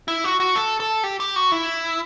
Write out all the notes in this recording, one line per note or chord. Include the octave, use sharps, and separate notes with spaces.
E4
F#4
F#4
A4
A4
G4
G4
F#4
E4